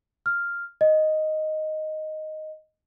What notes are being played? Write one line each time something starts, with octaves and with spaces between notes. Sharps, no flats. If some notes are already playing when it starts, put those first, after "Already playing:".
F6
D#5